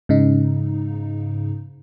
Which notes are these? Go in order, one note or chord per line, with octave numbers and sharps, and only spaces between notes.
G#2 C#3 D#4